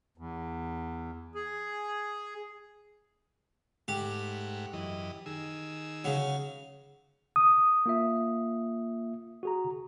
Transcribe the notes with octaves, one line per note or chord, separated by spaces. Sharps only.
E2
G#4
G#2 A3 G4 F#5
F#2 E3 D#5
D#3 G#4 E6
C#3 F#3
D#6
A#3 F4 E5
F#4 G#4 A#5